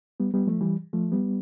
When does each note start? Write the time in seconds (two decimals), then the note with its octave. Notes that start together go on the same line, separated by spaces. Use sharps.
0.20 G3 B3
0.33 G3 B3
0.47 F3 A3
0.61 E3 G3
0.93 F3 A3
1.12 G3 B3